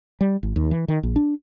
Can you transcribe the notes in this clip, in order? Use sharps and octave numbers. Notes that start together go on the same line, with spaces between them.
G3
G#1
D#2
E3
D#3
A#1
D4